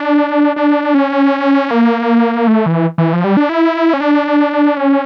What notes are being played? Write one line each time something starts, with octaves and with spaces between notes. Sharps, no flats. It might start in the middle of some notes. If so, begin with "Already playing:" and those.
Already playing: D4
D4
C#4
A#3
A3
E3
E3
F3
G3
D4
E4
C#4
D4
C#4